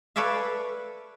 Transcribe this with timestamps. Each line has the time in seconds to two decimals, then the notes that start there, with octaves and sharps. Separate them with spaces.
0.16 A4 B4 C#5 D5 E5 F5